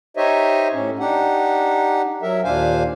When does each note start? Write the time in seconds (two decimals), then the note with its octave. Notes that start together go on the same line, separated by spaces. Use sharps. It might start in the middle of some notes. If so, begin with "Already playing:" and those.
0.17 D#4 G4 C5 C#5 D#5 E5
0.73 A2 C#4
0.99 D4 D#4 G4 F#5
2.22 F#3 A#4 E5
2.44 D#2 A#2 D4 C5 F5 G#5